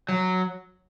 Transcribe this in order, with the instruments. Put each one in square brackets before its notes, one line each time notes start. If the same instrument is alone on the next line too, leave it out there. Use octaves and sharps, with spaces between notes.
[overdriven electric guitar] F#3